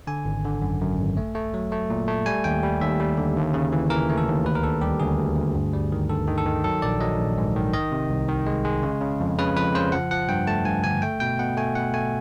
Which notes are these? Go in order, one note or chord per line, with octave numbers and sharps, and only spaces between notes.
D3 G#5
G#1
D3
F#2
F#2
G#1
A3
A3
F#3
A3
A#2
A3
G3 G#5
D#2 G5
G3
D#2 E5
G3
D3
D#2
C#3
E3
E3 A#4
A3
A4
D#2
D2 B4
A#4
D3 A4
G3 G4
D2 G#4
D2
D2
G2
G3
D#3
G2 A4
D#3
A4
D#3
F#3 A4
A#1 D5
F#3 D#5
A#1
G#2
D#3
D#3 D#5
C3
C2
D#3
G#3
G#3
C#3
C#3
F2
C#3 B4
F2 B4
C#3 C5
F3 F#5
F3 F#5
G2 G5
A3 A5
G2 G#5
D3 G#5
A3 G5
B2 G5
B2 F#5
A3 G#5
B2 F#5
A3 G#5